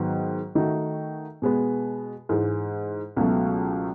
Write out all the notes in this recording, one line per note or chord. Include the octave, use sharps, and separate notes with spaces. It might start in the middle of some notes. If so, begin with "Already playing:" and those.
Already playing: G#2 D#3 F#3 B3
D#3 A3 D#4 F#4
B2 G#3 B3
G#2 E3 G#3
C#2 B2 F#3 A3